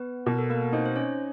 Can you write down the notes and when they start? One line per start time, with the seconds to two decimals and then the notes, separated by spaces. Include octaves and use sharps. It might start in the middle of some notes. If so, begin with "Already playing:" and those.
Already playing: B3 B4
0.26 B2 A#4
0.38 A4
0.50 A#3 A#4
0.72 C4 D#4 C5
0.86 C5
0.96 C#4 C#5